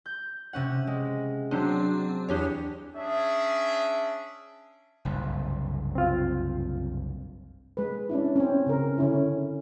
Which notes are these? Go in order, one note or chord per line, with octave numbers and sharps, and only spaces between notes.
G6
C3 C#4 F#5
G#3
F#3 C4 D4 C5
E2 D4 G4 C#5
C#4 D4 G#4 E5
F#1 C2 G2
C4 F4
G#3 B4
C#4 D4 E4
C4 C#4
C#3 A#4
D3 C#4 E4